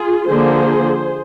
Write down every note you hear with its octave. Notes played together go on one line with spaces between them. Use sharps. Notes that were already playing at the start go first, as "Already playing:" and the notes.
Already playing: F4 G#4
D3 F3 A#3 G#4 C5